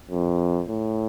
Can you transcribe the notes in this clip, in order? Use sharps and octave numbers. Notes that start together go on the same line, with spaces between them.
F2
A2